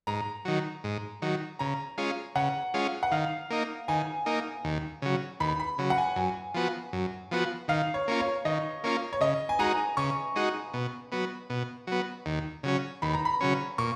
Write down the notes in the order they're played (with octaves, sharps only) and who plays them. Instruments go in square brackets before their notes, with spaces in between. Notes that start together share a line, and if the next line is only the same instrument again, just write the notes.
[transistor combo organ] G#2 [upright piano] A#5
[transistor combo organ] D#3 F#3
G#2
D#3 F#3
[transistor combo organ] C#3 [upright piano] A#5
[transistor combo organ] G#3 C#4 F4
[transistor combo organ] C#3 [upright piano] F#5
[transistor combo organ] G#3 C#4 F4
[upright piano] F#5
[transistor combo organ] D#3 [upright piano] F5
[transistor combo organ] A#3 D#4
[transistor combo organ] D#3 [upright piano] G#5
[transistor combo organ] A#3 D#4
D#2
C#3 F#3
[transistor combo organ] D#2 [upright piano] B5
[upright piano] B5
[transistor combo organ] C#3 F#3
[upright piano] F#5
G#5
[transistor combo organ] F#2 [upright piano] G#5
[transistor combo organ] F3 B3 F#4
F#2
F3 B3 F#4
[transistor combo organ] D#3 [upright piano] F5
[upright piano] C#5
[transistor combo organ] A#3 C#4 F4
[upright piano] C#5
[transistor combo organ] D#3 [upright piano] D#5
[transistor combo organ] A#3 C#4 F4
[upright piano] C#5
[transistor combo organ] C#3 [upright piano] D#5
[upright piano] G#5
[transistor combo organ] G#3 D#4 F#4 [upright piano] A#5
[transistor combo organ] C#3 [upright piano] C#6
[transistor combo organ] G#3 D#4 F#4
B2
F#3 B3
B2
F#3 B3
D#2
C#3 F#3 C#4
[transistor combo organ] D#2 [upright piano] B5
[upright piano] A#5
B5
[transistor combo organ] C#3 F#3 C#4
[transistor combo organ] A#2 [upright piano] C#6